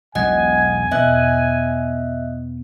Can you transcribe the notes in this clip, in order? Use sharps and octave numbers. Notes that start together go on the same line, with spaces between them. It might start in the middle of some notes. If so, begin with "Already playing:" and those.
E1 B1 E2 D#5 F#5 G#5 G#6
E2 B2 B3 D#5 E5 F#6 G#6